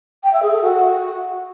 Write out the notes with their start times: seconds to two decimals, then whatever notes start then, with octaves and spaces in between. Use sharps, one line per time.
0.23 G5
0.33 E5
0.42 G#4
0.52 A4
0.62 F#4